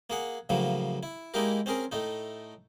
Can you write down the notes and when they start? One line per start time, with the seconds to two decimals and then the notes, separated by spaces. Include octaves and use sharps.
0.10 A#3 G#4 F#5
0.49 A2 C#3 F3 F#3 A#3
1.03 E4
1.34 G#3 A#3 D#4 E4 G4 A#4
1.66 C4 C#4 G#4 A#4
1.92 A2 A3 D#4